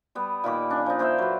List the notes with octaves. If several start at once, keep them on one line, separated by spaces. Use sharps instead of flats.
G3 B3
A#2 D#3 B5 D6
C#4 D4
F3 D#4
A#3 C5 D5 E5
F#3 B4